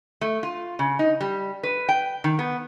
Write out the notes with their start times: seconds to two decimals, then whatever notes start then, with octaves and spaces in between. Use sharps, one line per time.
0.21 A3
0.43 F4
0.79 C#3
0.99 D#4
1.21 G3
1.63 B4
1.89 G5
2.24 D#3
2.39 B3